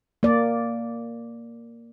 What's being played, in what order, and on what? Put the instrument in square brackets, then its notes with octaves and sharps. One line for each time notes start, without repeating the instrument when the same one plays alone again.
[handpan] A#3 D5